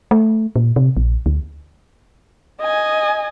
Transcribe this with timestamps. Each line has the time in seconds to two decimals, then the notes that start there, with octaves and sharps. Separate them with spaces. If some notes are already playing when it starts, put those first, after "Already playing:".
0.11 A3
0.56 A#2
0.76 C3
0.97 A#1
1.26 D2
2.61 D#5 G#5